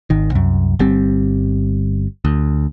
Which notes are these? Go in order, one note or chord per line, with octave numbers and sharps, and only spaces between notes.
G#1 D#3
C2 F#2
G1 G3 C4
D2